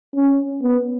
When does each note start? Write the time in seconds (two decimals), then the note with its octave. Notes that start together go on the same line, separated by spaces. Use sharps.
0.16 C#4
0.63 B3